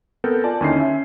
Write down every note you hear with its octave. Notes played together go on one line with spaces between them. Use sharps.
B3 C4 A4 A#4 G6
F4 D5 G#5 A5
D#2 D3 C#4 D#4 E4 C7
C#4 E5